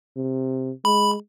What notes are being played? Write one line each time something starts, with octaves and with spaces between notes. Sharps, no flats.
C3
G#3 B5